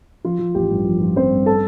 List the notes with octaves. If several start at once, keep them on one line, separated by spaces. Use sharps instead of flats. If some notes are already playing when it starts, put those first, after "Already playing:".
F3 F4
F3
A1 G4
G2
F3
F3
F3 C4 C5
G2
A4 A5